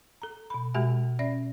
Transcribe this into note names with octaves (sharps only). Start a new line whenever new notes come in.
A4 A#5
B2 B5
B2 G#3 F#4 G4 E5 G#5
C#4 D5 E5 B5 A#6